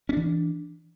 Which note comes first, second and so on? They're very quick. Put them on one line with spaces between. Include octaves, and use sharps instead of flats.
C#4 D4 E3